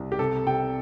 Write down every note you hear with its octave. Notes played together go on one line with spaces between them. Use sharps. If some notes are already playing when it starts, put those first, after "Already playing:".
Already playing: C2
G4
C3 A4
C3 G5